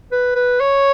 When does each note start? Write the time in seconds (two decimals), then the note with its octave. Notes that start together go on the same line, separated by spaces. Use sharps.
0.12 B4
0.35 B4
0.60 C#5